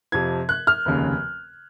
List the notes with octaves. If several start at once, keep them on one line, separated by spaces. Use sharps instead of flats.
F2 C3 F3 G#6
F#6
F6
F1 D#2 C#3